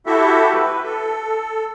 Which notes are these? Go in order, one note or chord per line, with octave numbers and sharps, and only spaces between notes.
E4 F#4 G4 A4 E5
B4
A4